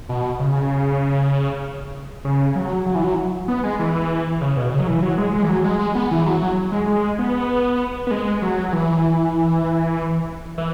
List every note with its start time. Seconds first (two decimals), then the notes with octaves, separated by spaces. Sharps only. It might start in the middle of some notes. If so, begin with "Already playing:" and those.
0.09 B2
0.40 C#3
2.25 C#3
2.56 F#3
2.86 F#3
2.95 E3
3.04 F#3
3.48 B3
3.63 G#3
3.79 E3
4.41 C#3
4.57 B2
4.72 C#3
4.79 F#3
4.87 E3
5.03 F#3
5.18 G#3
5.34 G#3
5.43 E3
5.49 F#3
5.64 G#3
5.79 G#3
5.95 B3
6.11 E3
6.26 F#3
6.41 F#3
6.72 G#3
6.88 G#3
7.19 B3
8.07 B3
8.11 G#3
8.42 F#3
8.68 F#3
8.73 E3
10.58 E3